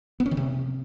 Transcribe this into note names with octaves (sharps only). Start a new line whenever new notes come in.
B3
C#4
D#3
C3